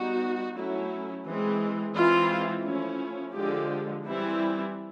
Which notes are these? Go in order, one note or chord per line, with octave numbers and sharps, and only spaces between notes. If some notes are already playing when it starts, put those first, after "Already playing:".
Already playing: G3 B3 D#4 F#4
F#3 A3 C#4 E4
E3 G#3 C4
E3 G#3 C4 E4 F4
F3 A3 C#4 E4
D3 F3 G#3 G4
E3 G3 C4 E4